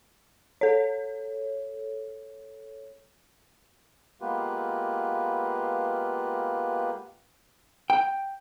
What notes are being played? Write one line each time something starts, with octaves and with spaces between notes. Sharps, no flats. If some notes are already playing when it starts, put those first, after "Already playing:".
A4 C#5
G#3 A#3 B3 F4 G4 B4
G5